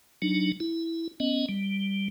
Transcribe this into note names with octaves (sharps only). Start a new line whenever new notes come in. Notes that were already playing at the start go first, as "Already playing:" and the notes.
F#3 D4 D#4
E4
B3 C#4 D#5
G3